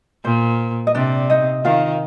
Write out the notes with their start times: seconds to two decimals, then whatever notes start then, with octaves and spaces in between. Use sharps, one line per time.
0.25 A#2 C5
0.87 D#5
0.95 C3 D4 D5
1.30 D#4 D#5
1.65 D#3 F4 F5